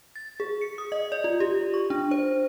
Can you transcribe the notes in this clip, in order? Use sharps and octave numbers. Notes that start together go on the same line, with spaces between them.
A6
G#4
C#7
D#6
D#5
D5
F4
G4
C#6
D4
C5